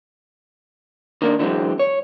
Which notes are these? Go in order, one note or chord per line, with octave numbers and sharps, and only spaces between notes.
D#3 A#3 D4
D3 E3 F#3 G#3 C4
C#5